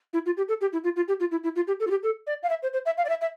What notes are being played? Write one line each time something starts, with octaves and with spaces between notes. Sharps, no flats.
E4
F4
G4
A4
G4
E4
F4
F4
G4
F4
E4
E4
F4
G4
A4
F4
G4
A4
D5
F5
E5
C5
C5
E5
F5
D5
E5
E5